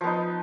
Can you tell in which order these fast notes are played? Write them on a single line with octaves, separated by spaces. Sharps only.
F3 B3 D#4